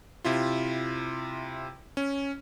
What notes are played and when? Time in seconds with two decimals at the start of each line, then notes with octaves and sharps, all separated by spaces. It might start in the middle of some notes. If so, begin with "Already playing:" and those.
0.25 C3 E4 F4
1.97 C#4